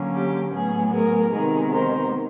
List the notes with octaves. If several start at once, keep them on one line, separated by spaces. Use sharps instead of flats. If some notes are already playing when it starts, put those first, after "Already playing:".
Already playing: D3 F#3 A#3 C#4
G4
A2 F#3 B3 G#4
G#4 A#4
C3 D#3 G#3 B3 D#4 G#4 A#4
A#4 C5